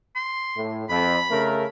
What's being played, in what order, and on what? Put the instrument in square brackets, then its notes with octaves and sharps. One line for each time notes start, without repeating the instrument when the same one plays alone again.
[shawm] C6
[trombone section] A2
[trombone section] F2 [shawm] B5
[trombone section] C#3 A3 A#4